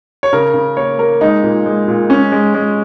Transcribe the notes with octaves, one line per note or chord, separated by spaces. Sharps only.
C#5
C#3 A#4
C#3
A#3 C#5
A#3 A#4
G#3 D#4
A#2
G#3
A#2
G#3 C#4
G#3
G#3